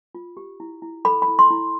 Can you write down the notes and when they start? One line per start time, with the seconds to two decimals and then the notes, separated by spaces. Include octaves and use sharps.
0.15 F4
0.37 G4
0.60 E4
0.82 E4
1.05 A4 B5
1.22 B5
1.28 E4
1.39 C6
1.50 E4